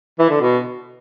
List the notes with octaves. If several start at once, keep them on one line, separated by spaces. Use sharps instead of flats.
E3
D3
B2